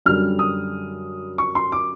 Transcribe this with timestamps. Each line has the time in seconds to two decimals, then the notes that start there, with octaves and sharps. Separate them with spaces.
0.06 F#2 D3 G3 F6
0.39 D#6
1.38 C#6
1.55 C6
1.72 D6